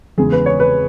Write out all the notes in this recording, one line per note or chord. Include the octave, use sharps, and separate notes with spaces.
E2 C#3 G#3 G#4
B4
C#5
B4